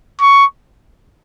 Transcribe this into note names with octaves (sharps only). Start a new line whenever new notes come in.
C#6